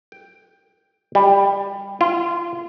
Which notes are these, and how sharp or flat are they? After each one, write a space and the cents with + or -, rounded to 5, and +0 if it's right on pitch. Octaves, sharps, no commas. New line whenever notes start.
G5 +5
G3 +15
F4 -30